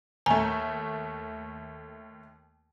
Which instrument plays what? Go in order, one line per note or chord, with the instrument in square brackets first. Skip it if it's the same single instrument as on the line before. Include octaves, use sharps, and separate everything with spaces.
[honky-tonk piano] D#2 A3 [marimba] G#5 A#5